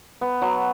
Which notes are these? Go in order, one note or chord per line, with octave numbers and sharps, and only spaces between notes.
B3
F#3